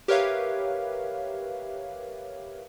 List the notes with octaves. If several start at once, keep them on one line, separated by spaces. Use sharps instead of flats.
G4 A#4 B4 C#5 E5 F5